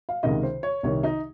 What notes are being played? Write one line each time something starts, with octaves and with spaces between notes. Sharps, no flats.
F5
C#2 C3 D#3 D#5
C5
C#5
C2 C3 D#3 C#5
D#4